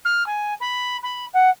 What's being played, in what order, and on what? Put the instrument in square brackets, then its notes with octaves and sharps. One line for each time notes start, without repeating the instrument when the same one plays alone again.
[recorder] F6
G#5
B5
B5
F#5